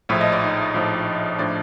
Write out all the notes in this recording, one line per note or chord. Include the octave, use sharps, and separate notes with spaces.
A#1 A2 F3 E5
D#5
D5
D#4 D#5
A#1 A2 F3
A2 F3 D4 D5